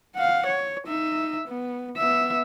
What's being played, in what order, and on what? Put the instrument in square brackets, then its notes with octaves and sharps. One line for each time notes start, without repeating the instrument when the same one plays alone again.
[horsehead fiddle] F5 F#5
C#5
D#4 E5
B3
B3 E5